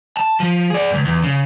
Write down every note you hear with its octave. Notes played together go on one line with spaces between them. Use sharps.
A5
F3
G#4 D5
C#2 G2
E2
C#3